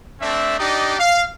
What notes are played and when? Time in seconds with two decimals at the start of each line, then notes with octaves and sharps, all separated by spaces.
0.22 A3 C4 D4 E5
0.58 D4 D#4 G4 D5 D#5
0.99 F5